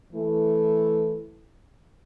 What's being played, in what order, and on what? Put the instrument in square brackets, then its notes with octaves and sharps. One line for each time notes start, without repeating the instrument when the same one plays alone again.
[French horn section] E3 A3 E4